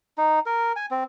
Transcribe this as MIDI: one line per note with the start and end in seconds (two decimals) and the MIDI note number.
0.18 0.39 63
0.46 0.72 70
0.76 0.86 80
0.91 1.04 60